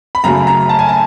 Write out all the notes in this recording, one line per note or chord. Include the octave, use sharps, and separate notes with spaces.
B5
F#2 C#3 F#3 A3 A#5
A#5
A5
G#5
A5